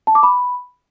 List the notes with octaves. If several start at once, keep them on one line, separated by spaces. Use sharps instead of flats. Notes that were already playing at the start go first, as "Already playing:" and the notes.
A5
D6
B5